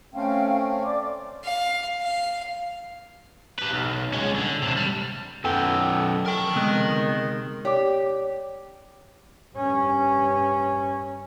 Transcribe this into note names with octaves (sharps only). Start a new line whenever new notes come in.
A3 C4 C#4 F5 G5
D5 D6
F5
F5
G4 B4
B1
G#3 C#4
D3
C3 D4
G3
F#2 B3 A4 G5
A#4 G5
C3 D#3 G#3 B3
G4 C#5 D5 D6
G2 C#4